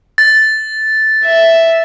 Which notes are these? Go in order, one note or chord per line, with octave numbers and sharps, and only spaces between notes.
A6
E5